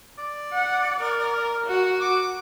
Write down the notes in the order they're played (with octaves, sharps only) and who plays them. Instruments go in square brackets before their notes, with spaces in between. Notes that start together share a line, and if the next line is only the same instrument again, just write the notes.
[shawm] D5
[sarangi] F#5
A#4
F#4
[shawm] D6